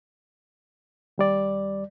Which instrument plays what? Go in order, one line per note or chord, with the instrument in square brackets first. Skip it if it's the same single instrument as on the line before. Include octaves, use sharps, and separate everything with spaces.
[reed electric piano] D#2 G3 D5